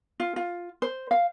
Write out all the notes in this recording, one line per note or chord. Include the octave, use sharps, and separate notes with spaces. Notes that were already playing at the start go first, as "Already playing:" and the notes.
F4
F4
C5
F5